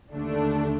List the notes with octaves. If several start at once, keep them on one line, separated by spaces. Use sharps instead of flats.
D#2 D3 A3 D4